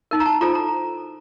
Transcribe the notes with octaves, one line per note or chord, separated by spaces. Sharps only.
D#4 A#4
A#5
A5
F4 A4 C5 A#5
A#5